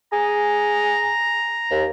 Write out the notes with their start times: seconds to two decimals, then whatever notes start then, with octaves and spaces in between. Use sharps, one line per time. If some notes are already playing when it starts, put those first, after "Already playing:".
0.13 G#4 A#5
1.71 D#2